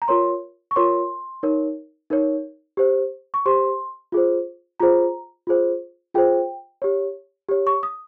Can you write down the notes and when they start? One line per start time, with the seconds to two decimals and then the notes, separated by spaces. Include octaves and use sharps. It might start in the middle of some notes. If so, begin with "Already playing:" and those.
0.02 A#5
0.08 F4 A#4 C#5 C6
0.71 C#6
0.76 F4 A#4 C#5 C6
1.43 D#4 A#4 C#5
2.10 D#4 A#4 C#5
2.77 G4 C5
3.34 C#6
3.46 G4 C5 C6
4.12 F4 G#4 C5
4.80 F4 G#4 C5 A#5
5.47 F4 G#4 C5
6.14 F4 G#4 C5 G5
6.82 G4 C#5
7.49 G4 C#5
7.67 C#6
7.83 D#6